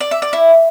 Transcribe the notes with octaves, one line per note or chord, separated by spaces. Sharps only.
D5
E5
D5
E4